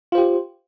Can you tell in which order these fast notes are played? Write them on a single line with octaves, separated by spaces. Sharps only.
F4 C5 G4